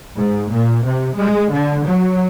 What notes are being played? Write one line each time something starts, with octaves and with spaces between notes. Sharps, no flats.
G#2
A#2
C3
G#3
D3
F#3